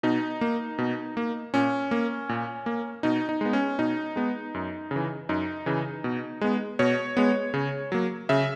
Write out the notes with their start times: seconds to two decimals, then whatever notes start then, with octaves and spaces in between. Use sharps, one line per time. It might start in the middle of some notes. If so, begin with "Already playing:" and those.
0.03 B2 D#4
0.41 A#3
0.78 B2
1.17 A#3
1.54 A#2 C#4
1.91 A#3
2.29 A#2
2.66 A#3
3.03 B2 D#4
3.29 D#4
3.41 G#3 B3
3.53 C#4
3.79 B2 D#4
4.16 G#3 B3
4.54 F#2
4.91 C#3
4.96 E3
5.29 F#2 D#4
5.66 C#3 E3
6.04 B2
6.41 G#3 B3
6.79 B2 C#5
7.17 G#3 B3
7.54 C#3
7.92 F#3 A#3
8.29 C#3 E5